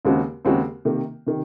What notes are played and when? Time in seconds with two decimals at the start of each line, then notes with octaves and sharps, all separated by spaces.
0.05 D#2 C#3 G#3 C4 F#4
0.45 D#2 C#3 G#3 C4 F#4
0.85 C3 D#3 A#3
1.27 C3 D#3